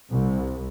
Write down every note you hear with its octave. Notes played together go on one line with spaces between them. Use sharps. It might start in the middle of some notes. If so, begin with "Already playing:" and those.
C2